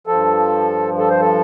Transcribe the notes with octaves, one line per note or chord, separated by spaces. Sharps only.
G2 F3 A4
A4
C5
A4